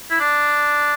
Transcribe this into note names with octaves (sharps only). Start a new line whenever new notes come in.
E4
D4